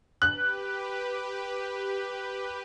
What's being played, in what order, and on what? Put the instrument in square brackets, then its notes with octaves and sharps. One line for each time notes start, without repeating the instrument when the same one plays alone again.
[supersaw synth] G4 B4 [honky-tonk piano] F#6